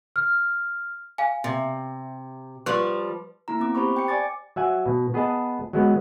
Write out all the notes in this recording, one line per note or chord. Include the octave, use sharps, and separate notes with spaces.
F6
F5 G#5
C3
F3 G3 B4 C#6 F#6
A#3 E4 A#5
B3 C4 D6
G4 C5 B5 C#6
G5 C#7
D5 G#5 D6 A6
F#3 E5 F#5 G#5
B2
B3 G#4 B4 D#5 A5
F#3 G#3 B3